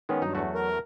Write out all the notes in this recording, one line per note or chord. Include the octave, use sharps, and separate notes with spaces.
D#3 G#3 B3 C#4
G2 F#3 D#4
E2 A3 F#4
A#4